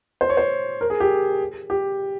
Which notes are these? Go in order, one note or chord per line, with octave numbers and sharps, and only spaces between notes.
C5
C#5
C5
A#4
G#4
G4
G4